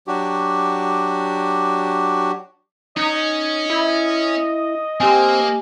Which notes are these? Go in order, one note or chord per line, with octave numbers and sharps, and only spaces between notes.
F#3 D4 F#4 G4
C#4 D#4 D#5
E4
A#3 C4 G4 G#5